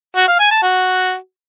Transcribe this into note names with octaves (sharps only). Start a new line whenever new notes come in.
F#4
F5
G#5
A5
F#4